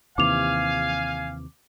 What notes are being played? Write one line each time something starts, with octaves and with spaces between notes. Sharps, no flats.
D#2 C3 E3 F5 G#5 D6 F7